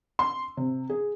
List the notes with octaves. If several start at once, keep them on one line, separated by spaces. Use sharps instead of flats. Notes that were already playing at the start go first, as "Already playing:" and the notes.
C6
C3
G#4